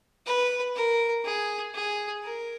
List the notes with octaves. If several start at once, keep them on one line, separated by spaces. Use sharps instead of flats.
B4
A#4
G#4
G#4
A#4